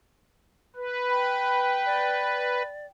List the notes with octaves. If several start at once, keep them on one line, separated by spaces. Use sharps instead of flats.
B4
G5 B5
D5